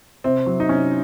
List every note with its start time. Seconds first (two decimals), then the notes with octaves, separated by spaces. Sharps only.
0.24 C3 C4
0.46 F#3
0.60 D#4
0.69 C3 C#4